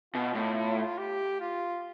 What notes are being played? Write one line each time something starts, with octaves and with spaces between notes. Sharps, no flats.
B2 F4
A2
G4
F4